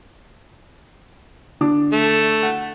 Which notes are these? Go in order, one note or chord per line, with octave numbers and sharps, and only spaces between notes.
D3 D4 D6
A3
F#5